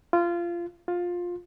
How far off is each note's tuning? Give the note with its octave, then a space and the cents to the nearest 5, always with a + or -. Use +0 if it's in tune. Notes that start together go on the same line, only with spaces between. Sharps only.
F4 -20
F4 +15